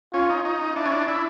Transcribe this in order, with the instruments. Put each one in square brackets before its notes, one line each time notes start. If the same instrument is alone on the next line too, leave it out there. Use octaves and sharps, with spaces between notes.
[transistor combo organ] C#4 [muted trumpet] F4
[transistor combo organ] D#4
D#4
[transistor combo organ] D4 [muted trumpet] E4
[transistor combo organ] C#4
D4
E4